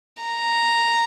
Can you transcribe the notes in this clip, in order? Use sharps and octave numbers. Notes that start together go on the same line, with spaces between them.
A#5